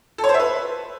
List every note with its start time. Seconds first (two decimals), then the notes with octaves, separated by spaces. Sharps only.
0.18 A4
0.24 C#5
0.29 C5
0.34 E5
0.39 B4